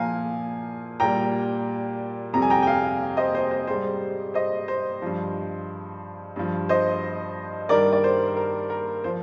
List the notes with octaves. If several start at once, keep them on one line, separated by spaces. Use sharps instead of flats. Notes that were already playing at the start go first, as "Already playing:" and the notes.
Already playing: A#2 F3 F5 G#5 A#5
A#2 G3 G5 A#5
F2 C3 G3 A#5
G#5
G5 A#5
G5
F5 G#5
C5 D#5
C5
C5
G#2 G3 C5
C5 D#5
C5
G2 F3
G2 F3
C5 D#5
G2 D#3 G3 A#4 D5
D5
C5
A#4
A#4
F3 C5